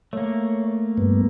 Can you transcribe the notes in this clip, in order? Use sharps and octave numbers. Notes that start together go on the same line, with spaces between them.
A3 A#3 C#5
G2 B3